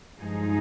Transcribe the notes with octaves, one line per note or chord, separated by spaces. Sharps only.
G2 F3 G#3 D#4 G#4